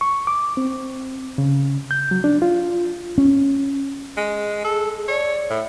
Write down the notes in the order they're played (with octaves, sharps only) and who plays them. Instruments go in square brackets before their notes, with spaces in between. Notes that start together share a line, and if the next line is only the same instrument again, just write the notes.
[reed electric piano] C#6
D6
C4
C#3
G6
F#3
D4
F4
[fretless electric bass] C#4
[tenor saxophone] G#3
[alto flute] G#4 [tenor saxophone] A4
[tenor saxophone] C#5 [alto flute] D5
[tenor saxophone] A2